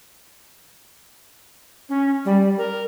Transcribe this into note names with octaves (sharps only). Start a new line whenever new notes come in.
C#4
G3
A#4